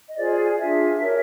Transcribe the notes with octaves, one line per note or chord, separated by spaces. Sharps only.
D#5
F4 G#4 C5 D5
D5
D4 F4 G#4 E5
F#4 A#4 C#5